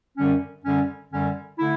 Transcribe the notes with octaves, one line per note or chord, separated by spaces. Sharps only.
F#2 D3 G3 C#4
F#2 D3 G3 C#4
F#2 D3 G3 C#4
D3 A3 E4